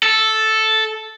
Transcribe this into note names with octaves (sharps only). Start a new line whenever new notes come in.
A4